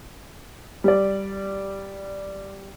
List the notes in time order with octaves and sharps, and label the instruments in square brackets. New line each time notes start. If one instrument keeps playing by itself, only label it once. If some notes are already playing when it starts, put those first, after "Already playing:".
[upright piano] G3 D5